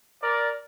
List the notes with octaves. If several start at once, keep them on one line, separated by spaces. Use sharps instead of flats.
A#4 D5